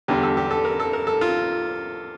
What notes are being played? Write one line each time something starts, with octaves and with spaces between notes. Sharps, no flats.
E2 D3 G3 G4
A4
G4
A4
A#4
A4
A#4
A4
F4